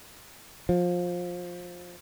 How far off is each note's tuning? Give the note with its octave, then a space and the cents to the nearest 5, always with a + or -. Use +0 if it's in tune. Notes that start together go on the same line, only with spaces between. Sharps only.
F3 +20